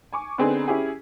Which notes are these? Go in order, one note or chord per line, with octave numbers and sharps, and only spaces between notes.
G#5 C#6 D6
D3 B3 C4 D#4 G#4 B4
C#4 E4 G4 G#4